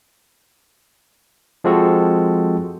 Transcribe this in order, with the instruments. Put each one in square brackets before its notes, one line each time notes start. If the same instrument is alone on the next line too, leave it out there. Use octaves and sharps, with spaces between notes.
[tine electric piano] F3 G#3 C4 F#4 A4